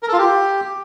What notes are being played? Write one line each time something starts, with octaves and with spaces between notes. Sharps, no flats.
A#4
A4
F4
G4